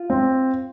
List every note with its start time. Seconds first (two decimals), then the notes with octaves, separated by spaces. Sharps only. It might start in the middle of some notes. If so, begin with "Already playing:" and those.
Already playing: F4
0.10 C4